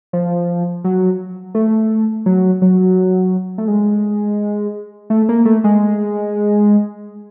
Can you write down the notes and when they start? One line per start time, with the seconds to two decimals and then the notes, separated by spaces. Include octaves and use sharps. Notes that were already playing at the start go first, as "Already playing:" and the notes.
0.13 F3
0.84 F#3
1.55 A3
2.26 F#3
2.62 F#3
3.58 A3
3.68 G#3
5.10 A3
5.29 A#3
5.45 A3
5.64 G#3